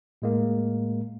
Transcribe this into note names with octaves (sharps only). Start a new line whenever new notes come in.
A2 G#3 A#3